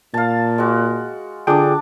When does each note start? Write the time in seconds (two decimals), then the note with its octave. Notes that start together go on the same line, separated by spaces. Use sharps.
0.14 A#2 F5 A5
0.58 G#3 F#4
1.47 D3 D4 F4 G#4 G5 D6